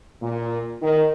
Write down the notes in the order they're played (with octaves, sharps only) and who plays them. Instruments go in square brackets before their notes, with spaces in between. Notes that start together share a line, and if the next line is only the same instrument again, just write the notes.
[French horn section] A#2
D#3